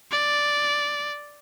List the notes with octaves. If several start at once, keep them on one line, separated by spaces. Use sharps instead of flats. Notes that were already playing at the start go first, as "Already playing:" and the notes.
D5